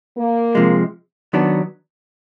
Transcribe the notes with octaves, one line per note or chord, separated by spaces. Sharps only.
A#3
C3 F3 G#3
D#3 F#3 B3 D4